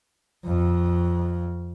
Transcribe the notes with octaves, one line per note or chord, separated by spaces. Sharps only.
F2